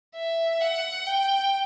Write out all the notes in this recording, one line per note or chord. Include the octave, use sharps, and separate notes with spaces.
E5
F#5
G5